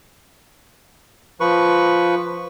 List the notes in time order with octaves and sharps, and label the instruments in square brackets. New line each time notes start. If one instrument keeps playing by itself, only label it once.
[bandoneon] F3 B4 C#6